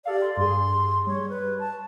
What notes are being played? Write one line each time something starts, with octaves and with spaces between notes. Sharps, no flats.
G4 A4 D5 F5
C6
G2 G#4 C6
G3 C#5
B4
A5